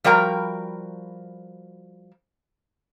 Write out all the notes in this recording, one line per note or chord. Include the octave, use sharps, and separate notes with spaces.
F3 G3 F#4 A#4 G5 A#5